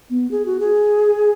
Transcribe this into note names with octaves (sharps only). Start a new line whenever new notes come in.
B3
G#4
F#4
G#4